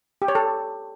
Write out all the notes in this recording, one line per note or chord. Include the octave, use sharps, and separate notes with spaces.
G4
C#5
A4